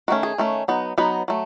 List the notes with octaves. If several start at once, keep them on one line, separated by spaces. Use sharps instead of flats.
D#3 A3 C#4 F#4
G#4
D#3 A3 C#4
F#3 B3 D#4
F#3 B3 D#4 B4
F#3 A3